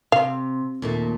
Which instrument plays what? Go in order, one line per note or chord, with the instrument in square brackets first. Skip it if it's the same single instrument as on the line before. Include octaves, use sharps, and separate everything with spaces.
[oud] C3 [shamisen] F5
[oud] D#2 A#2 A3